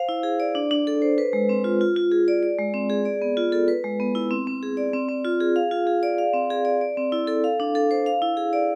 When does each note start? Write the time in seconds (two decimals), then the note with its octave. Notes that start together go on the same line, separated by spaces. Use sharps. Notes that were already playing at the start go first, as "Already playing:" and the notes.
Already playing: C5 F5
0.09 E4
0.23 G#4
0.40 D5
0.55 D4
0.71 D4
0.87 A4
1.02 C5
1.18 B4
1.33 G#3
1.49 C4
1.64 F4
1.81 F4
1.96 F4
2.11 G#4
2.28 D5
2.43 D5
2.59 G#3
2.74 C4
2.90 G#4
3.05 D5
3.22 B3
3.37 F4
3.52 A4
3.68 B4
3.84 G#3
4.00 B3
4.15 E4
4.31 C4
4.47 C4
4.63 G#4
4.77 D5
4.93 C4
5.09 C4
5.25 F4
5.40 G#4
5.56 F5
5.71 F4
5.87 G#4
6.03 D5
6.18 F5
6.34 C4
6.50 G#4
6.65 D5
6.81 D5
6.97 C4
7.12 E4
7.27 A4
7.44 F5
7.60 D4
7.75 A4
7.91 C5
8.06 F5
8.22 E4
8.37 G#4
8.53 D5